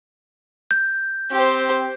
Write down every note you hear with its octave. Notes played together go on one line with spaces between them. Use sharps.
G6
C4 G4 C5